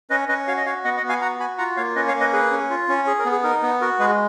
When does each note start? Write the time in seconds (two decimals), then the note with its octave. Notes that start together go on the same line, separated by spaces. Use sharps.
0.10 C#4 B4 D#5
0.29 C#4 B4 D#5
0.47 F#4 C#5 F5
0.57 D#5
0.66 F#4 C#5 F5
0.84 B3 D#5 F#5
0.97 D#5 F#5
1.03 B3
1.09 F5 G#5
1.21 F#4 F#5 A#5
1.40 F#4 G#5 B5
1.58 F4 F#5 A#5
1.77 A#3 C#5 F5
1.96 C#4 B4 D#5
2.08 C#5 F5
2.14 A#3
2.20 B4 D#5
2.33 G#4 B4
2.52 C#4
2.70 F4
2.89 C#4
3.07 G#4
3.19 A#4
3.25 B3
3.32 G#4
3.44 D#4 A#4
3.63 B3
3.81 F#4 A#4
3.99 G#3 G#4 B4